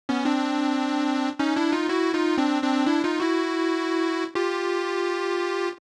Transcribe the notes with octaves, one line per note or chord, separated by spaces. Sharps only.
B3 C#4
C4 D4
C#4 D#4
D4 E4
D#4 F4
E4 F#4
D#4 F4
C4 D4
C4 D4
D4 E4
D#4 F4
E4 F#4
F4 G4